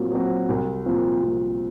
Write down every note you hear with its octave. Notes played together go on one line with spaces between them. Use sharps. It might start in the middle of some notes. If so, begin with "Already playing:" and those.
Already playing: A#2 F#3 C4
F#3 C4 F#4
C2
A#2 F3 C4
C2